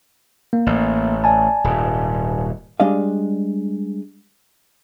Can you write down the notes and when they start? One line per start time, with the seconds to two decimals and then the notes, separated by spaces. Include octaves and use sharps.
0.53 A#3
0.67 A1
1.24 D5 G#5 A5
1.64 D#1 G#2
2.80 G3 G#3 D4 D#5 F5